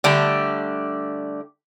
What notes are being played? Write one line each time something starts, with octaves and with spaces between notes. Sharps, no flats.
D3 G3 A3 D4